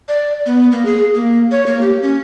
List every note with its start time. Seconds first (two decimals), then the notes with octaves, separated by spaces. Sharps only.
0.08 D5
0.46 B3
0.72 A#3
0.85 G#4
1.14 A#3
1.51 C#5
1.66 A#3
1.81 G4
2.02 C#4